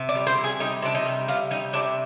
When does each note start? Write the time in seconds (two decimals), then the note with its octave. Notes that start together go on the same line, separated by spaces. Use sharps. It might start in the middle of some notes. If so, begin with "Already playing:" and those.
Already playing: C3
0.09 D5
0.15 G3
0.27 C5
0.38 C3
0.44 G#4
0.60 G3 D#4
0.82 C3 D4
0.95 D#4
1.06 G3
1.28 C3 F4
1.51 G3 D#4
1.73 C3 D4